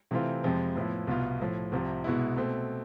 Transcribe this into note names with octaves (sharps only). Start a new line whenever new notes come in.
C3 E3 A3 C4 F4
F2 C3 F3 G#3
A2 F3 B3 E4
C2 B2 B3 F4
A2 F3 A3
C2 C3 F3
C2 B2 G#3 B3 E4
B2 A3 C4